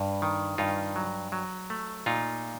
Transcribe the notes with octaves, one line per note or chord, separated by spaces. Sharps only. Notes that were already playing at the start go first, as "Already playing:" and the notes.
Already playing: G2
D#3
G2 D#4 F4
F#3
F#3
A3
A#2 D#4 F4